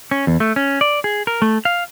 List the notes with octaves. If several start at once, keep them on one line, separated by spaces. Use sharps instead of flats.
C#4
E2
A3
C#4
D5
G#4
A#4
A3
F5